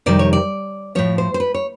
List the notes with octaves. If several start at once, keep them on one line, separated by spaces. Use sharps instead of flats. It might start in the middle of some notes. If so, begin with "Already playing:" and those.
F2 C3 D#3 G3 D5
C#5
D5
A2 F3 C#5
C5
C5
B4
C#5